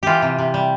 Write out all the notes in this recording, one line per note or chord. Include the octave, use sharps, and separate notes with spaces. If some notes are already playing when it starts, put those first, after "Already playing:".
E3 F4 G4
C3
C3
G3